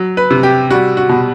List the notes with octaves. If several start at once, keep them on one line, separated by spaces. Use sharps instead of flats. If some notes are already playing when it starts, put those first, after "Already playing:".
Already playing: F#3
B4
C3
G4
G3 F#4
F#4
B2